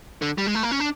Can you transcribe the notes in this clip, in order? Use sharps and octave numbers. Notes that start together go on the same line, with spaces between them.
D3
G3
G#3
A3
A#3
C#4
D4